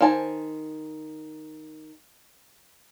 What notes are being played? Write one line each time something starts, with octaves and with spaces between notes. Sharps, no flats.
D#3 C5 G#5 A5